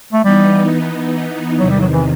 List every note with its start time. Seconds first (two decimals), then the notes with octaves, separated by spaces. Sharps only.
0.13 A3
0.24 E3 G3 B3 D#4
1.59 E2 C3 D#3 F#3
1.70 G3
1.81 F#3
1.93 E3